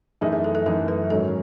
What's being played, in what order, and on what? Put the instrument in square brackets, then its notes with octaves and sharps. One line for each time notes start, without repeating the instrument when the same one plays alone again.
[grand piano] F#2 E3 A3 D#4 [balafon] G#4
[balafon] G#4
A4
A4
[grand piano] F#2 E3 A3 D#4 [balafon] A4
[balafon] B4
[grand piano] G#2 D#3 F#3 C#4 [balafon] A4